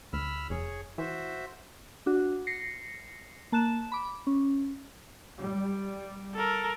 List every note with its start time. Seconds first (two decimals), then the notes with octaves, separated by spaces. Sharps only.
0.13 D2 B5 E6 F6
0.50 F1 G#4 C#5
0.98 E3 F#4 C5 E5
2.06 D4 F#4
2.47 A#6 C7 C#7
3.52 A#3 A5 F#6 E7
3.92 B5 D6
4.27 C#4
5.40 G3
6.35 A4 A#4